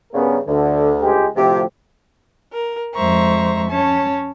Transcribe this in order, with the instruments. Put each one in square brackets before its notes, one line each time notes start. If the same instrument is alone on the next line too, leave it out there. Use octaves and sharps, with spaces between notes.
[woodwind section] G2 C#3 [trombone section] B3 C#4 A#4
[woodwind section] D2 [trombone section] D3
[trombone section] C#2 G#3 G4
[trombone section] D2 A2 F3 [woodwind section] C3 G4
[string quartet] A#4
F2 G#3 C5 E5 A#5 C#6
C#4 C#5 A5